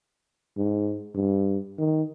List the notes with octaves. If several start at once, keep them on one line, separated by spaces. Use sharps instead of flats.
G#2
G2
D#3